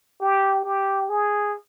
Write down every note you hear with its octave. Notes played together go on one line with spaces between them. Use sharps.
G4
G4
G#4